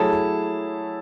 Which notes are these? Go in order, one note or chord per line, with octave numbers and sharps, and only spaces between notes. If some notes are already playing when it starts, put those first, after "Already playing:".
Already playing: F#3 A3 E4 G#4 C#5 A5